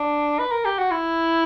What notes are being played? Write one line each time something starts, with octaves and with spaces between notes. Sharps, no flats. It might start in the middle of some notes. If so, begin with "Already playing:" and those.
Already playing: D4
B4
A#4
G4
F#4
E4